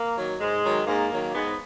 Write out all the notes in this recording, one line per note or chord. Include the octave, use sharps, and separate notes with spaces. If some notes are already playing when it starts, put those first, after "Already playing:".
Already playing: A#3
D#3 F#3
G#2 G#3
D#3 F#3
G#2 A#3
D#3 F#3
G#2 B3